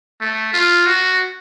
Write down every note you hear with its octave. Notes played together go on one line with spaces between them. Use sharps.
A3
F4
F#4